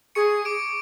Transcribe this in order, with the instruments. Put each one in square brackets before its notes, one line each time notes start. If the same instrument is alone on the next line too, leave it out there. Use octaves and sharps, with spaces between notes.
[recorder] G#4 [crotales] C#6 C#7
[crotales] D6 D7